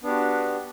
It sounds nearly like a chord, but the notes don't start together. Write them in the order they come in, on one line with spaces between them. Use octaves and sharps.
B3 D4 G4 F#4